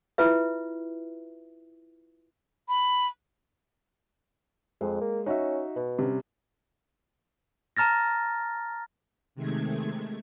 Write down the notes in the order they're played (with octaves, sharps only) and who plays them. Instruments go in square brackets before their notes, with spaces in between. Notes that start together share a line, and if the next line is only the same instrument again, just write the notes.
[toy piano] E4 F4 B4 E5
[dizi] B5
[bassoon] F2 [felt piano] G#3
[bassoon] A#3
[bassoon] C#4 [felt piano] D#4 F#4 E5
[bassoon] B2
[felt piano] C3 G3 C#4
[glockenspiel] A5 A#5 F6 A6 A#6
[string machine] C3 D#3 G#3 A3 G#6